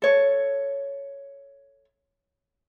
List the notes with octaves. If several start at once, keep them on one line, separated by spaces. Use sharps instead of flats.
A4 C#5